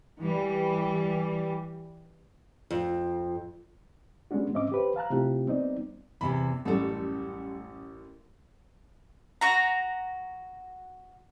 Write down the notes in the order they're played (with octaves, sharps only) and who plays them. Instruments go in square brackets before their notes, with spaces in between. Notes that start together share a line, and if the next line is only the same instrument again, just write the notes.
[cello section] E3 G3
[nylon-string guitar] F2
[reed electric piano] G3 G#3 B3 C#4 D4 F#4
G#2 C4 C#4 D#5 E5 D6
G4 B4 C5
F5 A5 A#5 F#6
C3 A3 C4 E4 F4 G4
G3 B3 C4 D#4 D5
[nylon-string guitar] E2 C3 E3 [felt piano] B5
[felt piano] A1 F#2 A4 [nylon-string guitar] G3 A3
[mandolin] F#4 A#5